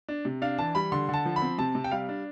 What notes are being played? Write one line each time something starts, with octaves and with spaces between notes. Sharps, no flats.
D4
C3
D4 F5
E3 A5
G3 B5
D3 C6
D3 A5
F3
B5
C4
C3 A5
C3
G5
G3 F5
D4